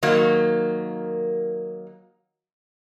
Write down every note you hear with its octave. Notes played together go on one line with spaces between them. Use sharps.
D#3 F#3 A#3